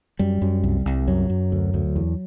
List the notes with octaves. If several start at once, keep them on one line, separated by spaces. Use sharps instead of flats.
F#2 G3
F#2
C2
C2
F#2 F#3
F#2
D2
D2
E2